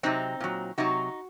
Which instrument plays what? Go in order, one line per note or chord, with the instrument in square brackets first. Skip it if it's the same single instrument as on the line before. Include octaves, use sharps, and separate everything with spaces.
[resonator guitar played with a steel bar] C3 F#3 C4 D#4
A#2 F#3
C3 F#3 D#4 F#4